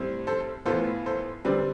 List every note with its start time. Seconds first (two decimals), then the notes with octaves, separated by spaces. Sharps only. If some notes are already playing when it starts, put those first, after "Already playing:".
Already playing: A2 G3 C4
0.27 A4 C5
0.65 A2 E3 B3 F4 A4 C5
1.06 A4 C5
1.45 D3 G3 C4 B4 D5